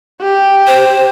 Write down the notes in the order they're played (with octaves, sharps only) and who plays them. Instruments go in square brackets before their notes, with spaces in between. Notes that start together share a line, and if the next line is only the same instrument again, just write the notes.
[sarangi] G4
[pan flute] C5